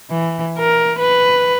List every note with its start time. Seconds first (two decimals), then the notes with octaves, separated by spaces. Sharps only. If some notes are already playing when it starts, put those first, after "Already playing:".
0.10 E3
0.58 A#4
0.99 B4